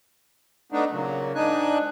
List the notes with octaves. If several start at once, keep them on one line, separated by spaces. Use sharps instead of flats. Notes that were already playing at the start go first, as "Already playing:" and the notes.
A3 B3 D4 D#4
A#2 C#3 F#3
G#2 D4 D#4 G#5 F#6